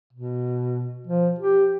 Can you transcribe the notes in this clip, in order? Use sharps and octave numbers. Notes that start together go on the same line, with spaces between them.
B2
F3
G4